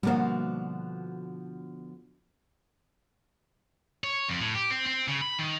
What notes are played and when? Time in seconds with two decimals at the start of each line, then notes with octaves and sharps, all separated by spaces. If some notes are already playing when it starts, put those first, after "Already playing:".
0.03 B2 D3 F3 G3 A#3
4.04 C#5
4.28 F2
4.41 A2
4.54 G4
4.70 C4
4.86 C4
5.08 C#3
5.22 B5
5.39 D#3